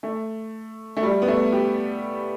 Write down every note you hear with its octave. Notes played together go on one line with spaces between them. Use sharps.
A3
A3
G3
B3
A3
G4